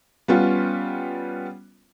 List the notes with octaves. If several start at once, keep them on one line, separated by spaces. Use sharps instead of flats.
G3 B3 C#4 F4